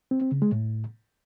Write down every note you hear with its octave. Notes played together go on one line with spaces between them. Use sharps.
C4
C4
C#3
G#3
A2